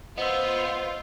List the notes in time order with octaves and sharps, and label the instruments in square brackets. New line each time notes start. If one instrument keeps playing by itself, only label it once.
[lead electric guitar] B3 [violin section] F4 [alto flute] C5 [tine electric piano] D#5 E6